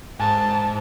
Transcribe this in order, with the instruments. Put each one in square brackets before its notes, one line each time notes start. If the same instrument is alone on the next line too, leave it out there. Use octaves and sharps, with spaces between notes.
[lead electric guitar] G#2 [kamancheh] A5